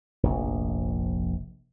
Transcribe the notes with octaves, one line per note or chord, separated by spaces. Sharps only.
F1 A#1